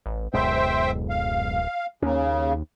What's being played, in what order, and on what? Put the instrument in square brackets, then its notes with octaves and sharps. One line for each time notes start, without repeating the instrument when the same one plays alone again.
[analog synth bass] A1
[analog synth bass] D1 [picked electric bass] F#2 B2 G#3 [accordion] C5 E5 G5
[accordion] F5
[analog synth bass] D#2 [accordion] C#3 [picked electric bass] A#3 C#4